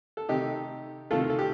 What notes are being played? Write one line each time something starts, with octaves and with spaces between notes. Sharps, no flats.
A4
C3 D#3 A3 D#4 G4
C3 D#3 A3 F4 A4
A4
G4